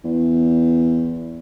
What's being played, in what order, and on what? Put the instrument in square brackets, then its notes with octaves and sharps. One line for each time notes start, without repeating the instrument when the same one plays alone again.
[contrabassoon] E2